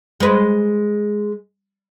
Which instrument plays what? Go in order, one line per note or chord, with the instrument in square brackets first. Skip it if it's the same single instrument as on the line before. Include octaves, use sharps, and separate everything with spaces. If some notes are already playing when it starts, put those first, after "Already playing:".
[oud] G#3 B4